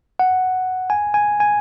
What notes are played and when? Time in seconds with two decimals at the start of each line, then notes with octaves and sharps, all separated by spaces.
0.19 F#5
0.90 G#5
1.14 G#5
1.40 G#5